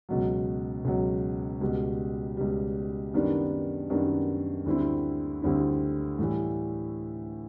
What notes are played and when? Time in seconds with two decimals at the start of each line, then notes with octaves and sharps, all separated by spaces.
0.09 C#2 B2 F#3
0.85 C#2 B2 F#3
1.61 C#2 B2 G3
2.37 C#2 B2 G3
3.13 F#2 D#3 G3 B3 D4
3.90 F#2 D#3 G3 B3 D4
4.66 D2 D3 G3 C4 E4
5.42 D2 D3 G3 C4 E4
6.19 A2 E3 G3